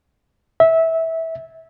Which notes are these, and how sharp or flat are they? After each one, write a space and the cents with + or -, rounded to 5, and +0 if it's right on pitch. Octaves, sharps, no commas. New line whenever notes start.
E5 -20